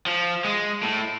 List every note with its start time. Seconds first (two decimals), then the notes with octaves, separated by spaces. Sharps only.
0.06 F3
0.44 G#3
0.83 A2